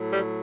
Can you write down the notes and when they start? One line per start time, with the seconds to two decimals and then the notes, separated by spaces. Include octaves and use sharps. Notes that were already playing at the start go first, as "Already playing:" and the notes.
Already playing: A2 F#3
0.11 G3